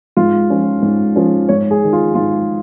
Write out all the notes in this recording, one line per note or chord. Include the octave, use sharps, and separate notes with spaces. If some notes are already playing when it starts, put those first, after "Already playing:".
G#2 F4
F3 C#4
G#2
F3 C#4
G#2 C#5
G#4
D#3 G#3
F4
G#2 F4